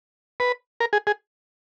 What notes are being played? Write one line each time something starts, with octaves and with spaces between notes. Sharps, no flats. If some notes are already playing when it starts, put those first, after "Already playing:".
B4
A#4
G#4
G#4